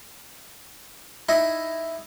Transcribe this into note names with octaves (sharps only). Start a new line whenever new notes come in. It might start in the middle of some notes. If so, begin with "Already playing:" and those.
D#4 E4